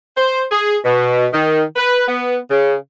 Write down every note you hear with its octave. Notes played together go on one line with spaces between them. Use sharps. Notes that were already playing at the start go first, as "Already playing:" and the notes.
C5
G#4
B2
D#3
B4
B3
C#3